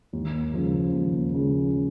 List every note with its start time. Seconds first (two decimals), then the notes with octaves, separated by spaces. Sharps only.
0.13 D#2
0.54 C#3 F3
0.93 D#2
1.34 C#3 F3